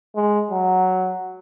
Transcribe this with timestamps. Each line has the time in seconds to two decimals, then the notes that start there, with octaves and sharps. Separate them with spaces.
0.15 G#3
0.51 F#3